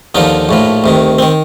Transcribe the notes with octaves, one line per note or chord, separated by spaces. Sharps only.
D#2 D3 F3 D#4
A#1 A2 F3
D2 C3 D#3
D#3 C4